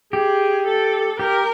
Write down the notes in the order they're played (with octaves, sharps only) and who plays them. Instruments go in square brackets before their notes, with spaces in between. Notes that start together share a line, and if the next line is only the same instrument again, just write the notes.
[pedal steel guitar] G4 [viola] G#4
[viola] A4
[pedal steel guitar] G4 [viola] A#4